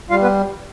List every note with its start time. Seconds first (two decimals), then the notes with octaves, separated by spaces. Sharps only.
0.10 G3 F4 F5
0.22 B3 B4